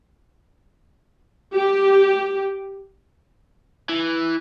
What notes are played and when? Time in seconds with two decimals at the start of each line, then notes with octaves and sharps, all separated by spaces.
1.54 G4
3.89 E3